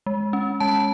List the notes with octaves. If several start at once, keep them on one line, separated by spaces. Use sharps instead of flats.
G#3
C#4
G#3 A5